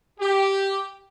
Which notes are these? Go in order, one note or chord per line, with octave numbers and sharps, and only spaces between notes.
G4